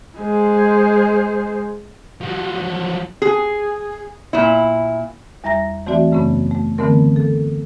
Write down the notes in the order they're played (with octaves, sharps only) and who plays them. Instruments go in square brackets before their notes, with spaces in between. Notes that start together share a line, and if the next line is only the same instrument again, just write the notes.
[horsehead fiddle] G#3 C5
[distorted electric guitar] F3 F#3
[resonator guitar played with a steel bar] G#4
A#2 E4
[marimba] E2 G3 E5 A#5 A#6
E3 A3 C4 F#4 D5 E5
F#2 C#3 A3 B3 C#4
A3
D3 E3 A3 B3 C4 A#4
A4